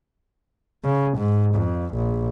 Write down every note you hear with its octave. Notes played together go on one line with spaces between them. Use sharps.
C#3
G#2
F2
A#1